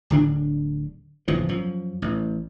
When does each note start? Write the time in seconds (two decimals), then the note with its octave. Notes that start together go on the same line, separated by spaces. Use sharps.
0.10 D1 D3 D4
1.28 F#1 E2 G#2 F3
1.49 F#2 F3
2.02 A1